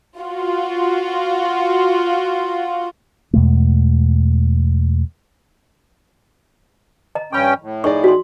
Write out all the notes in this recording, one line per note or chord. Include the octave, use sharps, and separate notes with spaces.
F4 F#4
E2 B2 G#3 A3
D#5 A#5
G2 C#4 G5 B5 C#6
A2
D#4 G#4 D5 C#6
F#4 C6